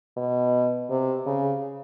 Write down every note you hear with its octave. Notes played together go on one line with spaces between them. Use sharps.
B2
C3
C#3